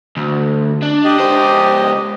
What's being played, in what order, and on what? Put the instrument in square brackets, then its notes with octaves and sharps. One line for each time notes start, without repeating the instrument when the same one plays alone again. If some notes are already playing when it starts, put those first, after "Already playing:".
[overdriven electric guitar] D2
D4
[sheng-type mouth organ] G4 D#5
[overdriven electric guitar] C#2 C5